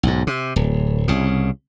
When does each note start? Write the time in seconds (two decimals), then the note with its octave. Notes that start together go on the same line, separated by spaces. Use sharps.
0.03 B1 G#2
0.27 C3
0.56 D1
1.08 C2 C#3